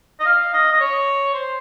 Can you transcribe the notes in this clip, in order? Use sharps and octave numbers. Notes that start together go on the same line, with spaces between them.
D#5
F5
D#5
D#5
C#5
C5